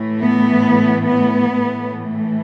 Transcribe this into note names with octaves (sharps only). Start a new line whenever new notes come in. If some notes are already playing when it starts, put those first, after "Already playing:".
Already playing: A2 E3 A3
B3
B3
A2 E3 A3